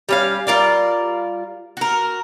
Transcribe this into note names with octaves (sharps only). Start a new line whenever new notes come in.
G3 C#4 F5
G3 F4 A#4 D5
F#4 A#4